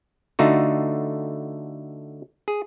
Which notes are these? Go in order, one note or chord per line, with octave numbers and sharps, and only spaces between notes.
D3 A3 D#4 F4 F#4
G#4